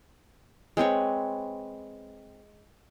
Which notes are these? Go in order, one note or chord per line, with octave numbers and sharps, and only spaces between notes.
G#3 C4 B4 C#5